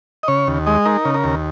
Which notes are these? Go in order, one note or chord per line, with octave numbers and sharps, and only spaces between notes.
D#5
C#3 C#5
D#2
G#3 D#5
D#4 A#4
C#3
A#4
D#2